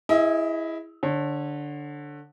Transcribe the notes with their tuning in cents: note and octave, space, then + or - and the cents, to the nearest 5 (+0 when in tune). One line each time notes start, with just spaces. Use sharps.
E4 +0 G#4 -15 D#5 +30
D3 +0 C#5 -30